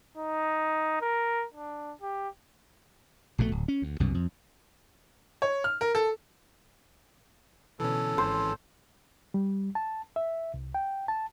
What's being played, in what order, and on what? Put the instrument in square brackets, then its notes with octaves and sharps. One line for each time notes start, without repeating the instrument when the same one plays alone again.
[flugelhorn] D#4
A#4
D4
G4
[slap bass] A#1 B2 E3 A3
D1
C#4
D2
C2 F#2 B2
F2
[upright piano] C#5
F6
A#4
A4
[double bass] B2 D3 [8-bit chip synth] E3 C#4 [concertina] A4
[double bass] G#1 [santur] C5
[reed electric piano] G3
A5
E5
C2
G5
A5